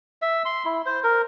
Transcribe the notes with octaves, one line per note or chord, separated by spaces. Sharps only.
E5
C6
E4
C5
A#4